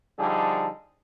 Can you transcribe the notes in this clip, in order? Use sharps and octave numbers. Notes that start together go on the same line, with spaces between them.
D3 F3 G3 D#4 G#4 A4